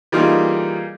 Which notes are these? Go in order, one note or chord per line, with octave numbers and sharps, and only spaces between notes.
E3 G3 A#3 D#4 F4 G#4